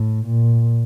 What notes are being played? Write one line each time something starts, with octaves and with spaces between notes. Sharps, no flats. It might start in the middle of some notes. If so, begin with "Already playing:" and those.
Already playing: A2
A#2